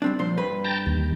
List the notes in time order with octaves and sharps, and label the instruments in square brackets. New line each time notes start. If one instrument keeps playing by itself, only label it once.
[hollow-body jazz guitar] G3 C4 D4
A#2 F3 C5
G2 B4 B5
[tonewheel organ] G5 A5 A#5
D#2